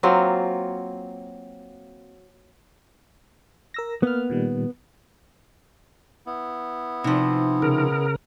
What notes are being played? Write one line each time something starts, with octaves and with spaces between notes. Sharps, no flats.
F#3 A#3 C4 F4
A#4 E6 A#6
A#3 B3 F6
A#2 D#3 G3
B3 E4
C3 F3 D#4
C#3 A#4